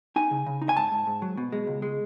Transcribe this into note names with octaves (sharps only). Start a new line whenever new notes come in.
D#4 G#5
C#3
C#3
D#4
G#5
G#2 A5
G#2
G#2
F#3
B2
G#3
C#2
G#3